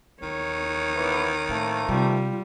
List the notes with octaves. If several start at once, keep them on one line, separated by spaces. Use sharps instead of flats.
D#2 D#3 C#5
E3 B3
A2 A3 A#3 C4
C3 G3 F4